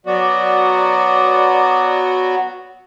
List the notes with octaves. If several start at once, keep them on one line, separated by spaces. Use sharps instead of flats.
F#3 B3 F#4 D5